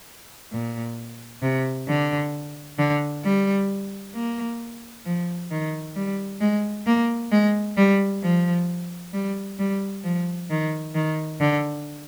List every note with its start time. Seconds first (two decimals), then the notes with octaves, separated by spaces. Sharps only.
0.52 A#2
1.42 C3
1.88 D3
2.78 D3
3.24 G3
4.15 A#3
5.05 F3
5.51 D#3
5.96 G3
6.41 G#3
6.86 A#3
7.31 G#3
7.77 G3
8.23 F3
9.13 G3
9.59 G3
10.04 F3
10.50 D#3
10.94 D#3
11.40 D3